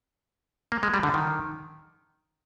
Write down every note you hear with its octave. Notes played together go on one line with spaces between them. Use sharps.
A#3
G#3
G3
D3
D#3